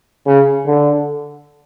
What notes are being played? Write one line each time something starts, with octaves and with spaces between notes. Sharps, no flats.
C#3
D3